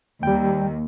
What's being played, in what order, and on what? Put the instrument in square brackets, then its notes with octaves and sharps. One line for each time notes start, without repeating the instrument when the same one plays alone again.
[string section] D#2 [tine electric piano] G3 G5